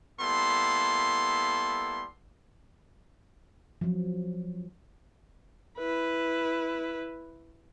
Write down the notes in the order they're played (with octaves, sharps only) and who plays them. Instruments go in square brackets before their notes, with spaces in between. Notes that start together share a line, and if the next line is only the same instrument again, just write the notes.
[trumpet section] G3 A#3 B3 E4 A4 C6
[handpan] F3 F#3
[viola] E4 B4